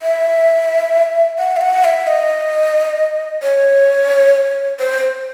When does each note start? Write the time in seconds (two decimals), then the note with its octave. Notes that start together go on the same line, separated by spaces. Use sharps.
0.02 E5
1.39 F#5
1.57 E5
1.61 F#5
1.84 E5
2.07 D#5
3.43 C#5
4.79 C5